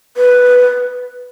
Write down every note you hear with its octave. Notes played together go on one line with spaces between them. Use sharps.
B4